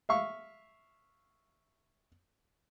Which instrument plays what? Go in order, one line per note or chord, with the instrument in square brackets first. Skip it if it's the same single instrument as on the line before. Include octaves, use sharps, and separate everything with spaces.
[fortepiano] E5 F5 C#6